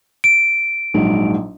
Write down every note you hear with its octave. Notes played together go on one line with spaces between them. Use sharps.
D7
A#1 G#2 F#3